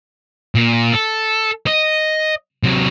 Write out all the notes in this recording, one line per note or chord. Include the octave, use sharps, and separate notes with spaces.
A#2
A4
D#5
C3 F#3